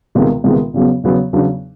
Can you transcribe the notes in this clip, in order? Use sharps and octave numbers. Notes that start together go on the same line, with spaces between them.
C#2 C3 D#3 G#3 B3
C#2 C3 D#3 G#3 B3
E2 C#3 F#3 B3
E2 C#3 F#3 B3
E2 C#3 F#3 B3 D4